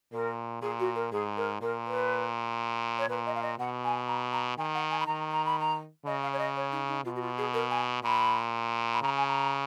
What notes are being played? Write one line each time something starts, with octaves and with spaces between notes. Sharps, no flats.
A#2 A#4
A#2 G#4
F#4
A#4
G#2 G#4
A#4
A#2 A#4
B4
C#5
A#2 B4
D#5
F5
D#5
B2 F#5
G#5
A#5
A#5
D#3 G#5
F#5
G#5
B5
D#3 A#5
A#5
B5
A#5
C#3 D#5
F5
C#5
D#5
C#5
D#4
D#4
B2 F4
F#4
F4
G#4
A#4
G#5
A#2 B5
B5
C#3 A#5
G#5
A#5